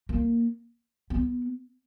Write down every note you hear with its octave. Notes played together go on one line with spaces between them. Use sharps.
A#3
B3